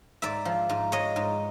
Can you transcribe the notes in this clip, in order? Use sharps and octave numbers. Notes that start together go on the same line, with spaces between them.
G#2 D5 E5
F3
G#2
G#3 C#5 D#5
G#2